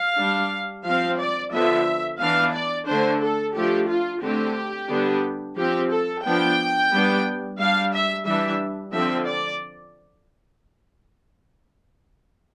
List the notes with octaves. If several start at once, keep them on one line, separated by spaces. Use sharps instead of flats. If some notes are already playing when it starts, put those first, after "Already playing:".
Already playing: F5
G3 D4
F3 C4 F5
D5
D3 F3 B3 E5
E3 B3 D4 F5
D5
D3 A3 D4 C5
A4
F3 A3 D4 G4
F4
D3 A3 C4 G4
D3 G3 B3 D4
F3 C4 G4
A4
F3 B3 D4 G5
G3 B3 D4
G3 D4 F5
E5
E3 G3 D4 E5
D3 F3 C4 E5
D5